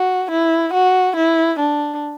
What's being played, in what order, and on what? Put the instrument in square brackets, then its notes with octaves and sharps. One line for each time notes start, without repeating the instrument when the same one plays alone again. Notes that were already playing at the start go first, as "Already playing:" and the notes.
Already playing: [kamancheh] F#4
E4
F#4
E4
D4